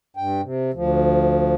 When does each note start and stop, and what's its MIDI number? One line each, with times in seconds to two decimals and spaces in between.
0.17 0.41 43
0.17 0.41 79
0.42 0.71 48
0.74 1.55 38
0.74 1.55 53